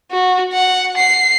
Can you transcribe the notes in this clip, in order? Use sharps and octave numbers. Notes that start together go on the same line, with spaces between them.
F#4
F#5
C7